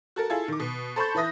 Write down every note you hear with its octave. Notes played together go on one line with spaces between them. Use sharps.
F#4 A4 A#4
E4 F4 G#4 A4
D#3 D6
B2
A4 C5 A5 B5 C#6 G6
E3 B4 E5 D#6 A#6